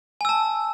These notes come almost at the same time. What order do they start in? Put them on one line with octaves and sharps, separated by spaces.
G#5 E6 A5